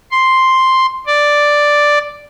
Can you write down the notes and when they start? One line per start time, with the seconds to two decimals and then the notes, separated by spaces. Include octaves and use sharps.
0.11 C6
1.06 D5